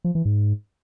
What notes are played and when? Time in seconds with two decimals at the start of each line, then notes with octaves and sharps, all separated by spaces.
0.04 F3
0.15 E3
0.25 G#2